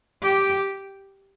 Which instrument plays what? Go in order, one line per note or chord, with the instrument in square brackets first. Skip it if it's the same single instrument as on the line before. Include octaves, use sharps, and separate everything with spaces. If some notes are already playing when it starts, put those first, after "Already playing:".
[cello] G4